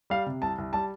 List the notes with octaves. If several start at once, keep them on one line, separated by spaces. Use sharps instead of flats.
G3 F5
C3
C2 A5
C2
G3 A5